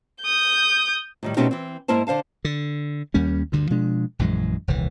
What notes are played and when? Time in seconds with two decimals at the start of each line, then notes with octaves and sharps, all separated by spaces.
0.24 D#6 G6
1.23 A2 D#3 G3
1.37 B2 A3 C4 C#4 D#4 G4
1.51 E3 C4
1.88 G#2 A#3 E4 A#4 C5 A5
2.07 D3 C5 F5 A5
2.45 D3
3.14 D#2 G3 A#3 C#4
3.52 D2 G2 D3
3.70 B2 F3 G#3 D4
4.19 A#1 F#2 E3 G#3
4.68 D#1 C2 E3